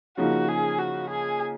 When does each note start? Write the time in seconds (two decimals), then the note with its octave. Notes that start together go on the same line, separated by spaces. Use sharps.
0.18 C#3 F3 A#3 D#4 F#4
0.49 G#4
0.79 F#4
1.10 G#4